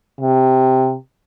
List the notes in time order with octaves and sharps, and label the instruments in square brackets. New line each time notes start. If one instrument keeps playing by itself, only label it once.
[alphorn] C3